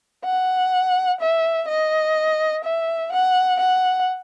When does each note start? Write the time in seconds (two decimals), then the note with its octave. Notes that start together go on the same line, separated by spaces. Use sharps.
0.25 F#5
1.21 E5
1.69 D#5
2.65 E5
3.13 F#5
3.60 F#5